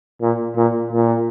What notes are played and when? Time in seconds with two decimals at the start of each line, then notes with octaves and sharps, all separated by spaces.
0.22 A#2
0.57 A#2
0.92 A#2